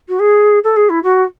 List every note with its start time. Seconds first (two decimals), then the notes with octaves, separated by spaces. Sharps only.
0.08 F#4
0.19 G#4
0.64 A4
0.76 G#4
0.89 E4
1.03 F#4